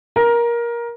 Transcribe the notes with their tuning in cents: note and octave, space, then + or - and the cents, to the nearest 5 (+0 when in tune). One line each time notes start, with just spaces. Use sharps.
A#4 +15